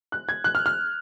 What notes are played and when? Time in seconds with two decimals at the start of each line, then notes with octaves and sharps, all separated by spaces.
0.12 F#6
0.29 G#6
0.44 F#6
0.55 F6
0.66 F6